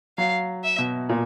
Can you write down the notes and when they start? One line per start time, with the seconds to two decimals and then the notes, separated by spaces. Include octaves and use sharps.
0.18 F#3 F5
0.64 E5
0.78 B2
1.09 A#2